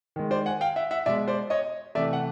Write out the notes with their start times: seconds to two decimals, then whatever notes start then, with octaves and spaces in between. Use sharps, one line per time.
0.16 D#3 G#3
0.31 C5 D5
0.46 F#5 G#5
0.61 F5 G5
0.76 E5 F#5
0.91 E5 F#5
1.06 B2 G#3 D5 E5
1.28 C5 D5
1.50 C#5 D#5
1.95 C3 E3 A3 D5 E5
2.13 F#5